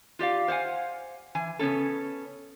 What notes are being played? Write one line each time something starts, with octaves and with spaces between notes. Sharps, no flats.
F4 G4 D5 F5
C5 F5 F#5 G#5
E3 G#5
C#3 B3 C#4 A4